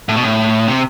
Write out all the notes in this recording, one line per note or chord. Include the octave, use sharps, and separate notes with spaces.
A2
B2
A2
C3